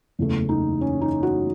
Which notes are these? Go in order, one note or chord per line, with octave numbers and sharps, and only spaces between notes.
F#1 E2 C#3 E3 A3
D#4
C#4
D#4
F#4